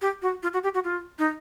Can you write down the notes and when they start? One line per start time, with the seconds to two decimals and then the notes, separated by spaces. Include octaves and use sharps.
0.02 G4
0.22 F#4
0.43 F4
0.53 F#4
0.64 G4
0.75 F#4
0.84 F4
1.19 D#4